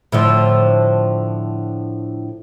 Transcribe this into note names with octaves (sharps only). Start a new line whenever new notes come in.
A2 D3 F3